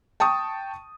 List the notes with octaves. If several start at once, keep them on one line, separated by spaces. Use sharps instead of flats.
G5 A5 C#6 D#6